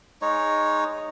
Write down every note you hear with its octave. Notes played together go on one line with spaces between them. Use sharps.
G#3 D#4 C#5